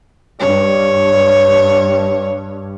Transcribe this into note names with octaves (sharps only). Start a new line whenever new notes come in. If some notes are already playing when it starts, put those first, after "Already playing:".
G2 C#5